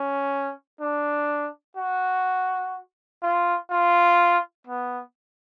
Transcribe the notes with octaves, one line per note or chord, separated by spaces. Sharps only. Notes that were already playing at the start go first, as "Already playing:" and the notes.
Already playing: C#4
D4
F#4
F4
F4
B3